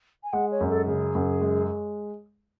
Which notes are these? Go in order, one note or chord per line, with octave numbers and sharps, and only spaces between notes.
G#5
G#3 F#5
C#5
F#2
A4
C#3 G#4
F#2
G#3